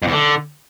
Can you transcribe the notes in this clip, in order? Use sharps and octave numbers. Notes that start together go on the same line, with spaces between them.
F2
E2
D3